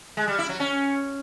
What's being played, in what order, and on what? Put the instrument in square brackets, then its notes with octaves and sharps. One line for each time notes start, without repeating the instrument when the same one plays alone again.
[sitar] G#3
G3
E4
F#3
C#4